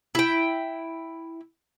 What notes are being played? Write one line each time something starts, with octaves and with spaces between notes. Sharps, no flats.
E4 G5